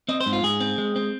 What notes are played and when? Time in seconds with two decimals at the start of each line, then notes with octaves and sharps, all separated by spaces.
0.08 C4 D#5
0.21 C5
0.26 G#2
0.33 F4
0.43 G#2 G#4
0.60 C4
0.78 G#3
0.96 C4